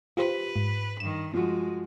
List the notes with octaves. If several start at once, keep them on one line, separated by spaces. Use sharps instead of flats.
F4 G4 B4 C5
G#2
G2 D#3 E7
F3 G#3 F#4